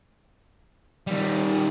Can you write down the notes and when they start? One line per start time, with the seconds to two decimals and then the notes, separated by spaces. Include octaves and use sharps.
1.07 D#3 G3